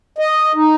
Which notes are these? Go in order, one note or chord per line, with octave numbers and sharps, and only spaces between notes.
D#5
D#4